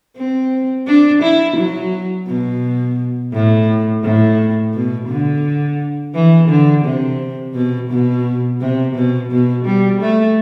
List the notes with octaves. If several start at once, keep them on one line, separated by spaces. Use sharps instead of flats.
C4
D4
E4
F#3
B2
A2
A2
B2
D3
E3
D3
C3
B2
B2
C3
B2
B2
G3
A3